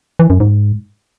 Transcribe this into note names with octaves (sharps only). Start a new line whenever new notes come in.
E3
F#2
G#2